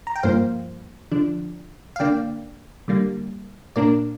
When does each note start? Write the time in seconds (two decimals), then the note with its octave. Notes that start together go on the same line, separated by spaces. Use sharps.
0.07 A#5
0.16 G5
0.23 G2 F3 A#3 C5 F5
1.12 D3 F3 D4
1.96 F5
2.00 D3 A#3 D4 D5 G5
2.88 D3 G3 A#3
3.76 A#2 A#3 D4 A#4 D5